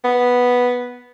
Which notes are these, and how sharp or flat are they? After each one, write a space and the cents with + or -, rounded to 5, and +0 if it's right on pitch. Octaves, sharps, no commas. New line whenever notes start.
B3 -5